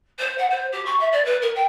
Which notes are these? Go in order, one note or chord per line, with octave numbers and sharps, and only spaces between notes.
C5
F#5
C5
G4
C#6
E5
D5
B4
A#4
G5